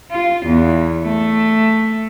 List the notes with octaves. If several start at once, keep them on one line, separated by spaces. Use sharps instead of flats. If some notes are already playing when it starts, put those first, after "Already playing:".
F4
E2
A3